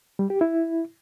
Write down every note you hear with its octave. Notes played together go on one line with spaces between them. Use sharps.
G3
G4
E4